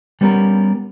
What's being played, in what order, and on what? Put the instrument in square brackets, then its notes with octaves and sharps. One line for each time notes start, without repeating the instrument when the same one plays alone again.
[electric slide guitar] G3 B3 C#4 G4 A#4